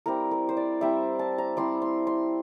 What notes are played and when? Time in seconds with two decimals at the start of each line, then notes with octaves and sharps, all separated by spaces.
0.06 G3 C4 E4 A#4
0.31 A#4
0.49 C5
0.57 D5
0.81 G3 C4 E4 E5
1.19 A5
1.38 A#5
1.57 G3 C4 E4 C6
1.82 C6
2.07 C6